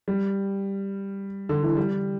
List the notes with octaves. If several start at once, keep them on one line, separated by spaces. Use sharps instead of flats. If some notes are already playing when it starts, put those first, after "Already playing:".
G3
D3
E3
G3